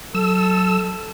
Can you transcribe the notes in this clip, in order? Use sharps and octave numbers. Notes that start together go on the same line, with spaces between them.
F#3 A4 E6